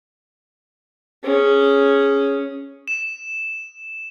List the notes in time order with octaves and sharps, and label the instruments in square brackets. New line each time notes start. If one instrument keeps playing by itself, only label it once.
[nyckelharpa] C#4 G#4
[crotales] E7